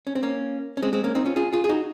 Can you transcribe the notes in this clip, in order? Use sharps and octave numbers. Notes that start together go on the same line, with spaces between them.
C#4
C4
A#3 C#4
C#4
G#3 C4
G#3 C4
A#3 C#4
C4 D#4
C#4 F4
F4 G#4
F4 G#4
G#4
D#4 F#4